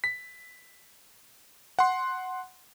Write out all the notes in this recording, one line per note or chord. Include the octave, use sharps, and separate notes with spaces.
B6
F#5 C6